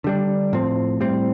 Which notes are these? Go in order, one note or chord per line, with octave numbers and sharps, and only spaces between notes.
D3 G3 D4
A2 F3 C4
A2 G3 C4